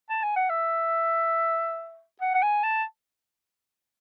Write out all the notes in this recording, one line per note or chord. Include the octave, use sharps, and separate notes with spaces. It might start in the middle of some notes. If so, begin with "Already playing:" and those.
A5
G#5
F#5
E5
F#5
F#5
G#5
A5